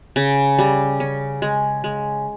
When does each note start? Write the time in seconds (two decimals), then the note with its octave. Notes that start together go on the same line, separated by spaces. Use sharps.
0.16 C#3
0.59 G3
1.00 C#4
1.42 G#3
1.84 G#3